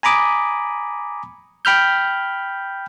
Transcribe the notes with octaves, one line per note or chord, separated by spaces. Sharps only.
G#5 A#5 B5 D6 D#6
G5 B5 F6 G6